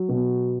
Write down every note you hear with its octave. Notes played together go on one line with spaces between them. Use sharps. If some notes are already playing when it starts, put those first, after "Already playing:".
Already playing: F#3
B2